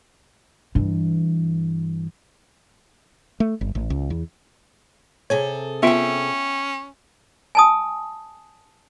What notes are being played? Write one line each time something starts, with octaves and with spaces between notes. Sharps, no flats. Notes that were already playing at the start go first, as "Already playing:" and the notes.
G2 E3
A3
G1
A1
C#2
E2
C3 G#4 A4 C#5
B3 C#4 F4 E5 G5 D7
G#5 A5 D#6